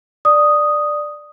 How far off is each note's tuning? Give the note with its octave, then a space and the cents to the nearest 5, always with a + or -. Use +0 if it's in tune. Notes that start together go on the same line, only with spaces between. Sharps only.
D5 +10 D#6 +0